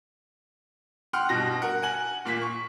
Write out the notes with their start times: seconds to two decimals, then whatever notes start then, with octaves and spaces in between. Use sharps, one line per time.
1.13 F#5 G5 C6 F6
1.29 G2 B2 A#6
1.62 A#4 F#5
1.82 F#5 G#5 F#7
2.25 A#2 A#3 B6
2.42 C#6